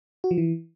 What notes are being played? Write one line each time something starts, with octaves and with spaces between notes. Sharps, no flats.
F#4
F3
E3